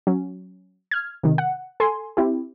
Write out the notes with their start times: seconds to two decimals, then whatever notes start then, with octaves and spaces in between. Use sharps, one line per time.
0.07 F#3 C#4
0.91 F6 G#6
1.23 C3 D#3
1.38 F#5
1.80 A4 G#5 C6
2.17 C4 E4 G4